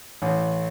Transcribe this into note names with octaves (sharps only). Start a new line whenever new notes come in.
A1